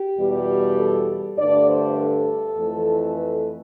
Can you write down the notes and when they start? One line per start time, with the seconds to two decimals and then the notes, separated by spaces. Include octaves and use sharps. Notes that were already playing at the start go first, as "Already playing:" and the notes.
Already playing: G4
0.18 E2 B2 G3
0.78 A4
1.37 G2 D3 A3 D5
1.67 C5
1.97 A4
2.57 F2 E3 A3
3.17 B4